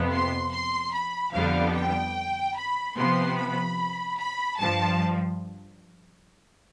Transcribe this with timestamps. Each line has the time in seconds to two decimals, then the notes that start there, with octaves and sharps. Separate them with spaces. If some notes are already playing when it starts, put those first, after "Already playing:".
Already playing: F2 C3 F3 B3
0.11 C6
0.51 C6
0.93 B5
1.33 F2 D3 G3 B3 F5
1.74 G5
2.56 B5
2.96 C3 F3 B3 C6
3.37 B5
4.18 B5
4.58 G2 F3 A5